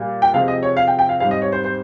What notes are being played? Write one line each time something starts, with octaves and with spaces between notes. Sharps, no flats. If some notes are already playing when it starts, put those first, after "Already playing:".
Already playing: A#2 G3 A#3
G5
C3 F3 G#3 C4 F5
D#5
C#5
F5
G5
G5
F5
G#2 G3 C4 F5
D#5
C#5
C5
C5